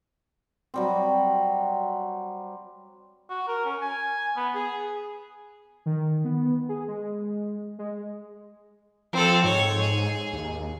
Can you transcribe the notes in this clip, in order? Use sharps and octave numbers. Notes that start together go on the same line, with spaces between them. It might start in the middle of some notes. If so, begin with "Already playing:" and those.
F#3 G3 C4
F#4
A#4
C#4
G#5
B3
G#4
D#3
B3
G#4
G#3
G#3
F3 C4 A4
G#2 C#5
G#4
D#2